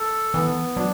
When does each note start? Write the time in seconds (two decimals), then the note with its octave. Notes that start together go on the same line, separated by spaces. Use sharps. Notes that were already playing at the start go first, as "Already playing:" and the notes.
Already playing: A4
0.34 E3 B3
0.76 F#3 D4